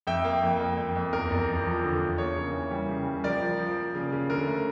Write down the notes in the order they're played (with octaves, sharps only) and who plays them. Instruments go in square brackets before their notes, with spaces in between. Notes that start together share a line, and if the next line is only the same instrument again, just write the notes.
[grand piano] F2 E5 G5
A#3
F2
F2
F2
F2
E2 A#4
E2
F3
F3
D3
E2
A#3 C#5
C#3
E3
G3
C#3
G3
F3 A#4 D5
F3
F3
A#3
C#3
C#3
D3 A#4
A3